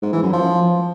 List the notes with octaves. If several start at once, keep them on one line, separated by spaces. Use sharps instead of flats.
G#2
E3
F#2
F3